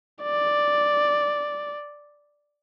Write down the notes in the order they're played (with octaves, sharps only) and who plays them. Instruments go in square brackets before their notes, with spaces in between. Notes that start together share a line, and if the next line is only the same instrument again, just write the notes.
[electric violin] D5